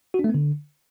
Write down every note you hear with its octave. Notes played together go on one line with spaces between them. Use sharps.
F#4
D4
A3
B3
D3